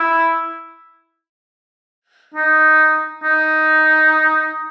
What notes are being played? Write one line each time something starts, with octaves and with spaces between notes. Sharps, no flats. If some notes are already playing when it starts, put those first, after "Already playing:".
Already playing: E4
D#4
D#4